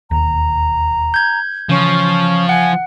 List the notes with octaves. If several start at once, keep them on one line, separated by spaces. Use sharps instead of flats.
E1 D#2 A#5
G6 G#6
C#3 E3 F3 C#4
F#5 G#5